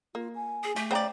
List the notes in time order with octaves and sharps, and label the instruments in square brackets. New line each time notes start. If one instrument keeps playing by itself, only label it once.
[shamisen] A#3 [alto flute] F4
[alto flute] G#5
[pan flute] G#4
[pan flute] A3 [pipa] G4
[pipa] C#3 D5 [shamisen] C5 G5 A#5